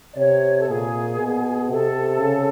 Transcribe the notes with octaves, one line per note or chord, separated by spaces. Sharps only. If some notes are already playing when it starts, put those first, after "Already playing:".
D5
C3 C#5
A4
A#2 G#4
B2
C3 A4
C#3